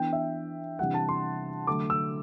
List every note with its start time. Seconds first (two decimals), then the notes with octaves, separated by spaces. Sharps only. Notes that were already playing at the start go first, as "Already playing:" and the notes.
Already playing: E3 B3 D4 G5
0.13 E5
0.79 C3 E3 G3 D4 F#5
0.94 A5
1.09 C6
1.67 D3 F#3 A3 D6
1.90 E6